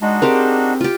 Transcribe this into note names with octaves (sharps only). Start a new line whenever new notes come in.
G#3 D4 D#4 F#4
C4 G4 G#4 A#4 C5 F5
F4 G4